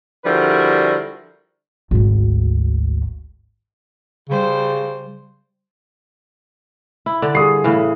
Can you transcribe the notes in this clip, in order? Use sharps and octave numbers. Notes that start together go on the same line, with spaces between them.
D3 F3 G3 E4 F#4 A#4
G#1 D2
C#3 G3 C5
E4
D3 D5
G2 G#4 D#6 C7
A2 C#3 E3